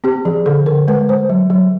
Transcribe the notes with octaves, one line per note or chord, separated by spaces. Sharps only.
C4 G4
F3 G#4
D3 A4
D3 A#4
G#3 B4
G#3 C5
F#3
F#3